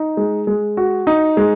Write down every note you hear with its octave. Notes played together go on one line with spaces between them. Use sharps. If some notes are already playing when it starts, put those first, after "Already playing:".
Already playing: D#4
G#3
G#3
F#4
D#4
G#3